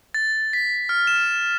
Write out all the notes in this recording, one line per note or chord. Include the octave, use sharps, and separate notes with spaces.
A6
B6
F6
E7